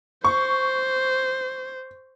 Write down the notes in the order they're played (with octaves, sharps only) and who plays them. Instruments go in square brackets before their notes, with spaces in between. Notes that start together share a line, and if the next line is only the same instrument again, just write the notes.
[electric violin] C5 [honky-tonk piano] C#6